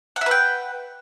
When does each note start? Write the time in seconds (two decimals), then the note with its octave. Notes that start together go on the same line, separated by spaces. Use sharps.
0.16 F#5
0.21 E5
0.26 B4
0.31 G5